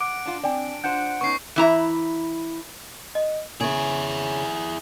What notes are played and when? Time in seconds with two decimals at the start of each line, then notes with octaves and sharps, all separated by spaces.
0.01 F#5 D6 D7
0.26 D4 F4
0.44 C4 D4 D5 G5 G#5
0.84 D4 F4 C5 F#5 G6
1.21 B3 C#4 D#4 C#6 C7
1.56 E3 E4 A#5
3.15 D#5
3.61 C#3 E4 G#4